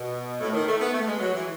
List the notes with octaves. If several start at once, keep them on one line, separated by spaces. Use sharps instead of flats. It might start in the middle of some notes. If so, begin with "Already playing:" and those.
Already playing: B2
A2
D#3
A3
B3
A3
G#3
F#3
E3